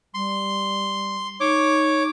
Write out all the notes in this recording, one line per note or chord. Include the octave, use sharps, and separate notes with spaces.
G3 C6
D#4 C#5 D6